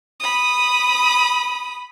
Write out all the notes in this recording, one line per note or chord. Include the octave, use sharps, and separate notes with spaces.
B5 D#6